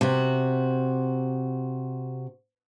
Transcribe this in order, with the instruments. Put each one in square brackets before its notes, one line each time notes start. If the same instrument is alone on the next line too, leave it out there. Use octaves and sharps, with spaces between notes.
[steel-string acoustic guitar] C3 F#4